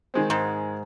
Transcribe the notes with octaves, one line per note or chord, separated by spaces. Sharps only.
D#3 G#3 C4
G#2